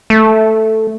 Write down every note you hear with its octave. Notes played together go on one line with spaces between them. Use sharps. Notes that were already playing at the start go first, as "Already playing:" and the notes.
A3